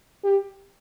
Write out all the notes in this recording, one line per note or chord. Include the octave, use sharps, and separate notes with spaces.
G4